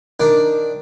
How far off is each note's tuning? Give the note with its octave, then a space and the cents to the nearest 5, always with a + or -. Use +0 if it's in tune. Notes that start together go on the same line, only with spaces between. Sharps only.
D#3 +0 D4 +0